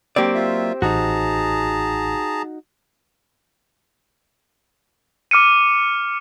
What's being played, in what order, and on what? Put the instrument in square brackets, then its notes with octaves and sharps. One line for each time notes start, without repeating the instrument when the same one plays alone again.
[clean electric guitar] F#3 A#3 D5 [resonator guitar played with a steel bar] C4 G4
[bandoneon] F4 E5
[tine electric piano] A1 [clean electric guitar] D#4 F#4 [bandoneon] G#4 A5 A#5
[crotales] D6 F6 C#7 D#7